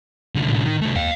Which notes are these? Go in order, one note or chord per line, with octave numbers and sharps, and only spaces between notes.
C2 D3
A2
D#3
C2 A3
D#2 F5 G5